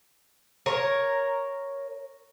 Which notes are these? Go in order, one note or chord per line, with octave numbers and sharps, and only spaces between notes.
A#4 C#5